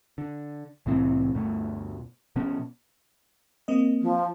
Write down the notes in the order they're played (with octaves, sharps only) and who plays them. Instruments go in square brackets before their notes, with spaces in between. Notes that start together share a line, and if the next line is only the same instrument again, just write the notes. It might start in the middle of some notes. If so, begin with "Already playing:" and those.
[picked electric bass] D3
C2 A2 E3 C4
D2 G2 B2 A3
B2 F3 B3 C#4
[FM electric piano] A#3 C4 D#5
[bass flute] F3